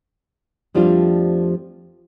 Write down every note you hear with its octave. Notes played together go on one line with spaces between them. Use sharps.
F2 F3 G3 A3 D4 F4